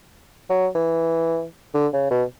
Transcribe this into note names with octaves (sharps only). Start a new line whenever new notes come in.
F#3
E3
D3
C#3
B2